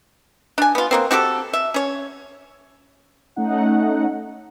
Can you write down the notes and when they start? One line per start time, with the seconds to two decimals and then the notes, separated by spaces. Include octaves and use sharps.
0.58 D4 G#5
0.75 B3 F4
0.91 B2 A#3 C4
1.11 C4 F#4 G4 A4
1.53 E5
1.74 C#4 C#5
3.36 A3 C#4 D#4 F#5